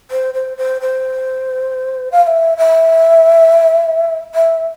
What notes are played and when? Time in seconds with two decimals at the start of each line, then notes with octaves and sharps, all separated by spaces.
0.11 C5
0.34 C5
0.57 C5
0.81 C5
2.12 F5
2.23 F5
2.27 E5
2.57 E5
4.35 E5